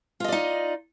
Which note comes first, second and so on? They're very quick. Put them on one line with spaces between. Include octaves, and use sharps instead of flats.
F4 D#5 D5 D#4